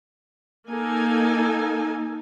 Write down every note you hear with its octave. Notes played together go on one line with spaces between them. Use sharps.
A#3 D#4 A4 G#5